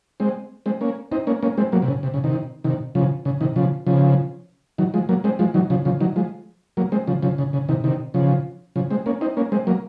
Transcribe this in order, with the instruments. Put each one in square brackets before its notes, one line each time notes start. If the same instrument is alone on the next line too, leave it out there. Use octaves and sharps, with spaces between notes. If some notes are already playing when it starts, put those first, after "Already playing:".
[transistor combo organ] G#3 C4
G#3 C4
A#3 C#4
C4 D#4
A#3 C#4
A#3 C#4
G#3 C4
F#3 A#3
C3
C#3
C3
C#3
C3 D#3
C3 D#3
C#3 F3
C#3
C3 D#3
C#3 F3
C#3 F3
D#3 F#3
F3 G#3
F#3 A#3
G#3 C4
F3 G#3
D#3 F#3
C#3 F3
C#3 F3
D#3 F#3
F3 G#3
F#3 A#3
G#3 C4
C#3 F3
C#3 F3
C#3
C#3
C3 D#3
C3 D#3
C#3 F3
C#3 F3
G#3 C4
A#3 C#4
C4 D#4
A#3 C#4
G#3 C4
F#3 A#3